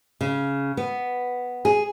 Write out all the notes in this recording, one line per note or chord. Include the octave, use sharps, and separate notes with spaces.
C#3
B3
G#4